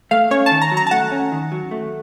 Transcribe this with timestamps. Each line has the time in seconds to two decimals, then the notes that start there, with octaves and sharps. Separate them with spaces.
0.11 A3 F5
0.31 C#4 C#5
0.46 D#3 A5
0.61 A#5
0.72 F#3
0.77 A#5
0.87 A5
0.91 A3 F#5
1.12 C#4
1.32 D#3
1.52 F#3
1.71 A3